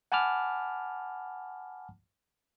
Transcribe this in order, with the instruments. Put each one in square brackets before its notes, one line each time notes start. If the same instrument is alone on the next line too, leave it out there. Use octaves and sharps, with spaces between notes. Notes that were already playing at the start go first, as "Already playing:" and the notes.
[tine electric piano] F#5 G#5 A5 B5 D6 F6